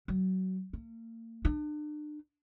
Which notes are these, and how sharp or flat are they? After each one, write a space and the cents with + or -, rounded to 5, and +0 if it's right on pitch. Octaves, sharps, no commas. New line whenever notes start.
F#3 +20
A#3 -40
D4 +35